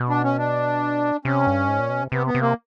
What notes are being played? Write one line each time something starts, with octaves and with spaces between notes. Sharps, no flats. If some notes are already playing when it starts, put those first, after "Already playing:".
Already playing: B2
D4
C#4
D4
C3 C#4
G2
G#2
A#2
B2
C3
C3 B3
B3
C3
A#3